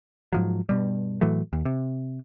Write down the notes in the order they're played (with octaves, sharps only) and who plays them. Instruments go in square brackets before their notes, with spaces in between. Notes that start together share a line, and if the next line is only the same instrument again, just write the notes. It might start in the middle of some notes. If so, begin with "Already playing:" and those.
[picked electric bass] G#2 F3 F#3
G2 B2 G3
A2 E3 F#3 A3
D#2
C3